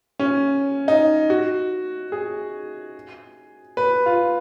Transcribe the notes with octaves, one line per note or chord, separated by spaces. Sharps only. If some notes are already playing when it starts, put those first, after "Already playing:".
C#4
D#4
F#4
G#4
B4
F4